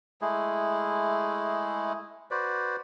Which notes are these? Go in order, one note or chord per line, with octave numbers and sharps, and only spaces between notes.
G#3 A3 E4 G#4
F#4 B4 C5 D5